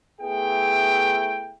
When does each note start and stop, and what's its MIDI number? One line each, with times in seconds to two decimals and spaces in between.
0.21 1.55 57
0.21 1.55 59
0.21 1.55 64
0.21 1.55 68
0.21 1.55 79